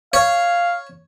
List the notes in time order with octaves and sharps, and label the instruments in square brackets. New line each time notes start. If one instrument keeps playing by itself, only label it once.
[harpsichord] C#5 [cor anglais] F5